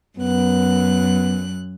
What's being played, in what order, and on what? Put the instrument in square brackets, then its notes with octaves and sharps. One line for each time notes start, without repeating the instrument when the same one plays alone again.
[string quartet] F#2 F#6 [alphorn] B3